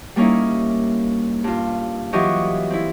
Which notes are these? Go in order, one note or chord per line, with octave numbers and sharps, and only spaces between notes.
G3 A#3 C#4 D#4 E4
G2 F4
E3 F#3 F4 G4 D#5 C#6
C4 E4